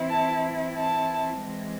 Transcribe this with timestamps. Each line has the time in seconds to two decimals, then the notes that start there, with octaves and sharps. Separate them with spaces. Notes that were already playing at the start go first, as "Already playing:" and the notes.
Already playing: E3 C4 E4
0.10 A5
0.78 A5
1.44 E3 G#3 C4